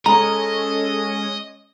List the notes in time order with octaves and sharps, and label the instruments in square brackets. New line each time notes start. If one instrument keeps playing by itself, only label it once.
[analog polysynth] G#3 C#4 C#5 [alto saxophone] A4 [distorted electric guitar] D#5 [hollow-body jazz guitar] A#5